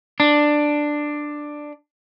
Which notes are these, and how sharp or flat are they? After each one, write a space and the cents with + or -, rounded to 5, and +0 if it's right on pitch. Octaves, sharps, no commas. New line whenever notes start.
D4 +10